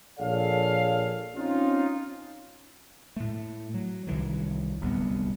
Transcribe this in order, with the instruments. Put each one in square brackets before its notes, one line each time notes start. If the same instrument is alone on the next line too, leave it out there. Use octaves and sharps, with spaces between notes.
[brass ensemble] A#1 G#4 A4 C#5 D5 F5
C4 C#4 D#4 F4
[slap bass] A2 A3
F#3
C2 D#3 E3 F#3
D1 C2 B3